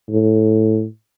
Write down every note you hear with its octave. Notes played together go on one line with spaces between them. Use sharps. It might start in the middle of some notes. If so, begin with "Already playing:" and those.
A2